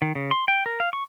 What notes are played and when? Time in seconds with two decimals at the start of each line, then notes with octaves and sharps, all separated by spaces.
0.02 D#3
0.15 C#3
0.31 C6
0.48 G5
0.66 A#4
0.80 F5
0.93 C#6